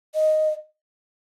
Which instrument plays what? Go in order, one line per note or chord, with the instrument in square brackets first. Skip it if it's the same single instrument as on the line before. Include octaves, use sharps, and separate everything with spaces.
[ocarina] D#5